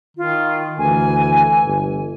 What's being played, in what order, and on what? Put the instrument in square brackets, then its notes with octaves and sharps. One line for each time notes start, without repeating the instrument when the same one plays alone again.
[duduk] D#3 [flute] F4
[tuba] D2 [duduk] E3 [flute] G#5
[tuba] G1